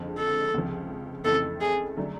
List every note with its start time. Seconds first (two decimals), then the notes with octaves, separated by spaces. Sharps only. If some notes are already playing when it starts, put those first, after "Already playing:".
Already playing: F2 D3 F3 G#3
0.18 A4
0.54 C#2 C3 F3
1.25 F2 C#3 E3 A3 C4 A4
1.61 G#4
1.97 D3 F#3 A3 D4